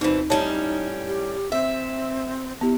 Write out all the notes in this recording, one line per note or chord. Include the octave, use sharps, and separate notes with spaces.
D2 B2 E3 D#4 C5
A2 G3 C#4 D#4 C#5 A5
G4
C4 E5
B3 E4 G4